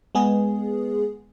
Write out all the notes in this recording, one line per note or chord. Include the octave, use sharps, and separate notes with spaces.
G#3 B3 G#4